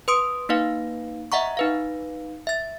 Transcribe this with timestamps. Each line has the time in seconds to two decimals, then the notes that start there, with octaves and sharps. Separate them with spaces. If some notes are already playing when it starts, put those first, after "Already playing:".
0.08 B4 C6 D#6 D7
0.49 A#3 D#4 B4 F5
1.32 D#5 E5 F#5 A#5 C#6
1.57 D#4 B4 F5
2.47 E5 A6